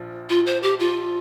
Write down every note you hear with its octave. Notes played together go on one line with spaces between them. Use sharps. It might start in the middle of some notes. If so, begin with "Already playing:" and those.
Already playing: A#1 F3
F4
C5
G4
F4